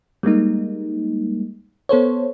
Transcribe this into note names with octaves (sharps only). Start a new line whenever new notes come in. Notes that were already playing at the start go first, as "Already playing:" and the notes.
G3 G#3 A#3 D#4
B3 A4 C5 C#5